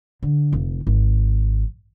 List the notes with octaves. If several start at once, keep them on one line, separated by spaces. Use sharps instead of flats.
D3
F1
G#1